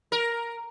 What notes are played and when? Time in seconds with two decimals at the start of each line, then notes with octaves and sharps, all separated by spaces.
0.12 A#4